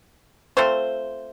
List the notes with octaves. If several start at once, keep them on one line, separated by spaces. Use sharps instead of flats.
A3 C4 F4 C5